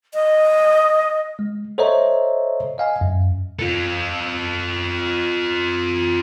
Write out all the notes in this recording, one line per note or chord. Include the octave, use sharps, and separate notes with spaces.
D#5
G#3
A4 C5 C#5 D#5 E5 A#5
D#5 F5 G#5
F#2
F4 A4